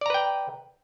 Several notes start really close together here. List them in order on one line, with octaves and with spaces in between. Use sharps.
D5 A#5 B4 G5